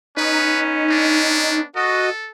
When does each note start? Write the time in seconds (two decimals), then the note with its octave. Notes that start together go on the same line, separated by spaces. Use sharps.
0.17 B3 C#4 D#4 B4
0.90 D4
1.76 F#4 A4 D#5